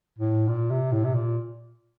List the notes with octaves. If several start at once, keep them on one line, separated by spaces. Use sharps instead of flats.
A2
A#2
C3
A2
C3
A#2